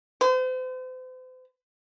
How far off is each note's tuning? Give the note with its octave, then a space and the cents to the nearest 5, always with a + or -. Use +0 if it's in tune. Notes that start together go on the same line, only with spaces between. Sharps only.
C5 -40